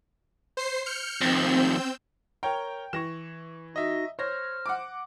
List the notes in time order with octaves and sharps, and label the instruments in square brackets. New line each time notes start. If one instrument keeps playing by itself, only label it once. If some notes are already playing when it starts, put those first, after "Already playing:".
[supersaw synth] C5 C7
F6 G6 C#7
[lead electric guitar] F2 D#3 [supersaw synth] C4 E6 G6
[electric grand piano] A#4 C#5 A#5 [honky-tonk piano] G5
[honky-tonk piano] E3 [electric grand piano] C#6 A#6 E7
[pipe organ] D#4 F#4 A#6 [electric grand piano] D#5 E5
[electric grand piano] C5 [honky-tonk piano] C#5 A#6 [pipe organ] F6
[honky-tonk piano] F#5 D6